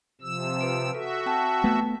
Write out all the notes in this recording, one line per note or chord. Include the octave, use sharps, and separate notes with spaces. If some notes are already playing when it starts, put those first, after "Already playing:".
C3 F3 E6
B4 D7
F#4 A4 E5
C4 G5 A5
A3 B3